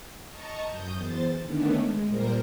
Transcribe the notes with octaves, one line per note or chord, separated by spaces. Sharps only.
D#5 A5 A#5 C#6
F#2 D#6 G6
E2 C5 A6
D3 D#3 A3 B3 C#4 D4
G#3
A#2 G3 A#3 A#4 C5 A#5